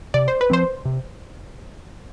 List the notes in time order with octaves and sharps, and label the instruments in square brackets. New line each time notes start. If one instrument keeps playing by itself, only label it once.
[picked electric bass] C3 [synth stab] D5
[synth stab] C5
B4
[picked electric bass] F3 C4 [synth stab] C5
[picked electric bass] C3